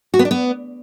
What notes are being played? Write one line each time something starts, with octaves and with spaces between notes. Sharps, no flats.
F#4
B3
D4
B3